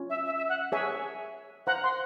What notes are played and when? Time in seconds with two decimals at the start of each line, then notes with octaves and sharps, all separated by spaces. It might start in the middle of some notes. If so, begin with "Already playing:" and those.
Already playing: C#4 F4
0.10 E5
0.26 E5
0.37 E5
0.49 F#5
0.72 G#4 C#5 E5 G#5
1.67 C5 F5 F#5 A#5
1.83 C6